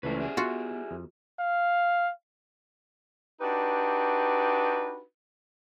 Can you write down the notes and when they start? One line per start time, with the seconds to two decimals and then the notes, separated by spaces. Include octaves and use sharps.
0.03 C#2 A2 E3 A3 C#4 D4 B4 C5
0.18 G3 E4 G#4
0.37 B3 F4 F#4 E5 F#5
0.91 F2
1.40 F5
3.41 D4 D#4 F#4 G4 B4